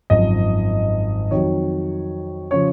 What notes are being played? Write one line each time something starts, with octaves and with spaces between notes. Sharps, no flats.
G#1 F#2 F3 D#5
F2 D#3 F#3 C#5
C#3 F3 C#5